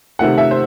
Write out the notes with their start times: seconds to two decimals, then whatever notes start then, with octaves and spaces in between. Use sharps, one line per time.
0.19 C3 D#3 A3 F#5
0.38 E5
0.51 C5